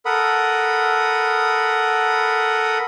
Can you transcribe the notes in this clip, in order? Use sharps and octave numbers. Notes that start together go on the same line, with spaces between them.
A4 A#4 F#5 B5 D#6